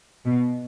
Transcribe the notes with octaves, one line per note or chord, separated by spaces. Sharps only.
B2